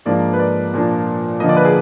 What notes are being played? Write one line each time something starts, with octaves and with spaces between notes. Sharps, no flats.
G#2 F3 A#3 D4 D5
B4
D5
A#2 F3 A#3 D4
D3 F3 A#3 D#5
D5
B4
G#4